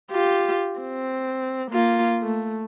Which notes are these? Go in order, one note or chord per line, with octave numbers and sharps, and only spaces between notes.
F4 G4
C4
A#3 F4
A3